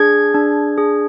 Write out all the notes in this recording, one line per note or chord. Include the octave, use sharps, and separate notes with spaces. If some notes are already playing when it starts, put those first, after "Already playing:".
Already playing: D4 G#4 G#6
D4
G#4